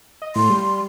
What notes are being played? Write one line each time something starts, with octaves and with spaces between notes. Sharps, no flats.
D#5
A2 C6
G3